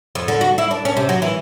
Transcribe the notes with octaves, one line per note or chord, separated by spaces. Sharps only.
F2
D3
F#4
E4
D4
C#4
C3
F#3
E3